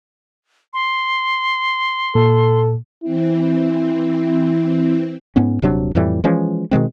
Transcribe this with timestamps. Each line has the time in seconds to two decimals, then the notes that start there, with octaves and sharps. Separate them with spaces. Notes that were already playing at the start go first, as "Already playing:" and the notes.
0.74 C6
2.15 A#2 A4
3.03 E3 C4 E4
5.36 G#2 B3 C#4
5.62 D#1 C3 F#3 D4
5.95 F2 A2 E3 G3
6.24 E3 F3 G#3 C#4
6.71 B2 D#3 G#3 C4